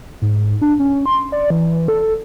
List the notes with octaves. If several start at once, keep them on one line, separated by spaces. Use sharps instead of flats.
G#2
D4
C#4
C6
D5
E3
A4